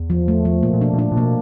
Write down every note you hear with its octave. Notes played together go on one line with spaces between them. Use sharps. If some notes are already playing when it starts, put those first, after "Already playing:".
Already playing: E2
F3
A3
F3
A#2 A#3
A#2
B2 D4
B2
A#2 D4
A#2
B2 A#3